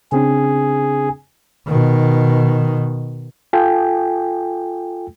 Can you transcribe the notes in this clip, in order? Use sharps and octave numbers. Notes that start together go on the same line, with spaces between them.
C#3 C4 D4 G#4
B2 D#3
F4 A4 G5 G#5